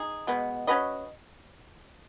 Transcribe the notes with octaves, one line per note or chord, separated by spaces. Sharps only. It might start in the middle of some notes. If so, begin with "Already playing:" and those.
Already playing: D#4 G#4
B2 G#3 B3
C#4 F#4 B4 D#5